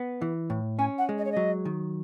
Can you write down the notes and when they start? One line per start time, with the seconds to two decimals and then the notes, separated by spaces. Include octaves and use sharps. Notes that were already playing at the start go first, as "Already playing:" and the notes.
Already playing: B3
0.22 E3
0.50 A2
0.79 C#4 G#5
0.98 F#5
1.09 G#3
1.18 D#5
1.25 C#5
1.32 F#3 D#5
1.65 D#3